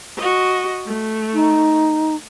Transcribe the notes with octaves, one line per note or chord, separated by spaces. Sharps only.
F#4 D#5
A3
D#4